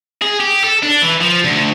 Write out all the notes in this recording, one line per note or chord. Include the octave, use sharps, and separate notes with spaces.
G#4
G4
A4
D4
E3
F3
D2